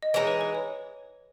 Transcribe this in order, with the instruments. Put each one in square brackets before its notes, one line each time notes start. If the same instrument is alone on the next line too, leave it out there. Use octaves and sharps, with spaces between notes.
[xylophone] D#5
[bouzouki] E3 G#3 D#4 [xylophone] C#5
[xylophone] B4
B4
C#5